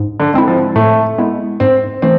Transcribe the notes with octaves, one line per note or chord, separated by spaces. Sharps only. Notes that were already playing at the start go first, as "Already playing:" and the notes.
Already playing: G#2
D3
G#3 C4 E4
F3
A2 A3
G#3 B3 E4
G#2 C4
E3 A3 C4